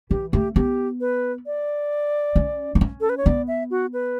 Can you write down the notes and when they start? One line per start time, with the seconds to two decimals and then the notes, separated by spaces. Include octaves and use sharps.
0.10 E3 G4
0.33 A3 G4
0.56 B3 G4
1.01 B4
1.46 D5
2.36 C#4
2.75 B3
2.81 C#4
3.01 A4
3.09 B4
3.17 C#5
3.26 B3 D5
3.48 E5
3.70 F#4
3.93 B4